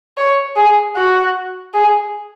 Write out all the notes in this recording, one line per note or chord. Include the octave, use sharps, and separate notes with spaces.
C#5
G#4
F#4
G#4